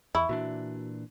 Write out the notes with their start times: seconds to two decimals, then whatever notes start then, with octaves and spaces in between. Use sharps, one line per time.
0.15 E2 E4 B5 C#6 E6
0.29 A#2 E3 D4 F#4